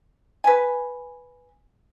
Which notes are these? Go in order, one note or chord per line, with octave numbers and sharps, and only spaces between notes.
B4 G#5